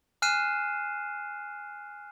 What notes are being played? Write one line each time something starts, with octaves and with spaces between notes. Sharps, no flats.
G#5 F6 F#6 C7 D#7 E7